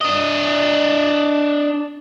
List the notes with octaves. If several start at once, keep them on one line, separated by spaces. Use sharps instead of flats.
D4 D#5